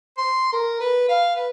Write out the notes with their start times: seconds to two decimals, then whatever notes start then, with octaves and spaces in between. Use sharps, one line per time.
0.18 C6
0.53 A#4
0.80 B4
1.09 F5
1.35 B4